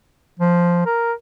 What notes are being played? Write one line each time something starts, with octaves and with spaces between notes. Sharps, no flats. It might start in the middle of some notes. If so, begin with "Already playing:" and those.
F3
A#4